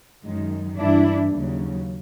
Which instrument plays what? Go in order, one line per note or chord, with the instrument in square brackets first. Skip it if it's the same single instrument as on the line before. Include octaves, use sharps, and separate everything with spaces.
[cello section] F#2 D#3 G#3
G2 E3 G3 D4 E4
D#2 C#3 F#3